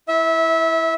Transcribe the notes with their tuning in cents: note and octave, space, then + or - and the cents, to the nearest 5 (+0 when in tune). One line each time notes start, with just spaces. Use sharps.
E4 +0 E5 -20